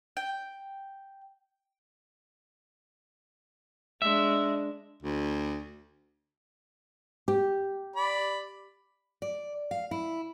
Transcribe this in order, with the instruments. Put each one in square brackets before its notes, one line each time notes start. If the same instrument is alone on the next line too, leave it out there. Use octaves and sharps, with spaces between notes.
[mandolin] G5
[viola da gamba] G#3 D4 [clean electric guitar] E5
[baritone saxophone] D2
[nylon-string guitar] G4
[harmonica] D5 B5
[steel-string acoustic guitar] D5
F5
E4